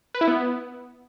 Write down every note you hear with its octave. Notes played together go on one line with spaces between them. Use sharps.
B4
E4
B3